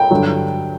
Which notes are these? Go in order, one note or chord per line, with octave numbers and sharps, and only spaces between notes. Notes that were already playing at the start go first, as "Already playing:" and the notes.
Already playing: G5
G2 D3 F#3